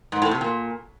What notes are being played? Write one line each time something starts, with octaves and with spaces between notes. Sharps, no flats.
G#2
A2
C3
A#2